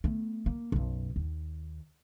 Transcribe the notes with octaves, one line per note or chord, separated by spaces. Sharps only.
A3 B3
A#3
B1 F#2
D#2